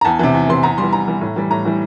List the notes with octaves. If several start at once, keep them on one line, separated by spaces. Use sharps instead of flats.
A#5
E2 A5
C3 E3
E2
C3 E3 C6
E2 A#5
E3 G3 C6
E2 A#5
E3 G3
A2
E3 G3
A2 A#5
E3 G3